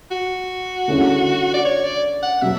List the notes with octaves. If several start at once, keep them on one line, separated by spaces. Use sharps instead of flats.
F#4
D3 A3 C#4 E4 G#4
D5
C#5
D5
F#5
B2 F#3 E5